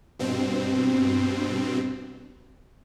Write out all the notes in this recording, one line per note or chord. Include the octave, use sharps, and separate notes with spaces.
G2 B2 C4